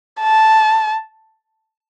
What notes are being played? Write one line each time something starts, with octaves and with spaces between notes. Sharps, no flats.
A5